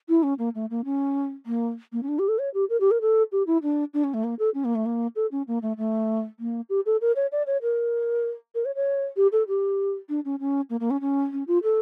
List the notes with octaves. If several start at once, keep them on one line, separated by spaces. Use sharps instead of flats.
E4
C#4
A#3
A3
A#3
C#4
A#3
A#3
C#4
D4
G4
A4
C#5
G4
A#4
G4
A#4
A4
G4
E4
D4
D4
C#4
A3
A#3
A4
C#4
A#3
A3
A#3
A4
C#4
A#3
A3
A3
A#3
G4
A4
A#4
C#5
D5
C#5
A#4
A#4
C#5
C#5
G4
A4
G4
D4
C#4
C#4
A#3
A#3
C#4
C#4
C#4
F4
A4